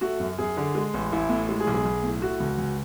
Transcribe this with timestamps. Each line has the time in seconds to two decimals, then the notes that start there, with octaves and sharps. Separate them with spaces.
0.01 A3 F#4
0.20 F#2
0.38 F#2 G#4
0.57 D3
0.75 G#3
0.94 A1
1.12 A1 E4
1.29 A2
1.49 G#3
1.60 G#4
1.67 B1
1.74 G#4
1.85 B1
2.04 A2
2.21 A3 F#4
2.40 C#2
2.58 C#2